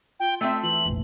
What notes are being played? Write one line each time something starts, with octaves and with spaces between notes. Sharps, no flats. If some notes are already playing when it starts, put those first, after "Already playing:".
F4 G5
A3 C4 E5 E6
E3 F#7
F1 A#1